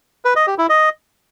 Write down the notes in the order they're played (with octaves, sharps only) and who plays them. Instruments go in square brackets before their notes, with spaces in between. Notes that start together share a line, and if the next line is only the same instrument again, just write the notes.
[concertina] B4
D#5
G4
E4
D#5